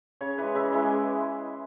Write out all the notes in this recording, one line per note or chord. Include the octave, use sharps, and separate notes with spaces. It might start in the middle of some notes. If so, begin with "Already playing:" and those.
C#3 C#5
E3 G#3 B4
C#3 E5
E3 G#3